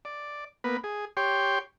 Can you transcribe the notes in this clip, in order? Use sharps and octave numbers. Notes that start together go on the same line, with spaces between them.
D5
A#3 B3 B4
G#4
G4 C#5 G5 C6